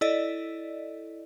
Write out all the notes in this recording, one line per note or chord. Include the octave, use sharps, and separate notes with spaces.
E4 A4 D5 D#5